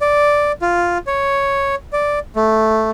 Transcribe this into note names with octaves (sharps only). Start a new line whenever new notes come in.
D5
F4
C#5
D5
A3